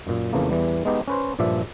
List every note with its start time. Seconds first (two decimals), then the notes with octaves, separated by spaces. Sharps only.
0.07 F#2 A#2
0.33 F2 C#3 E3 A3 A#3
0.50 E2 E3 G3
0.85 G#3 B3 D#4 G4
1.08 C#4 B4 C5
1.39 G2 A#2 F3 D5 E5